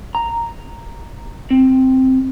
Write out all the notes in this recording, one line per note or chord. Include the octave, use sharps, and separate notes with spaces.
A#5
C4